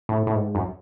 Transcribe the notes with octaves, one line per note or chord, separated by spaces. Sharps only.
A2
A2
G#2
F#2